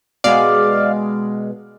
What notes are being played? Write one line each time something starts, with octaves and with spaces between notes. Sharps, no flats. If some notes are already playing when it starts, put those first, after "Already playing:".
B2 G#3 B3 D5 F5